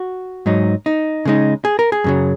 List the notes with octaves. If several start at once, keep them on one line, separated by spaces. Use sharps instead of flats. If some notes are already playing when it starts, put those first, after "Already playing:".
Already playing: F#4
G#2 F#3 D#4
D#4
C#3 G#3 D#4
G#4
A#4
G#4
F#2 C#3 F#3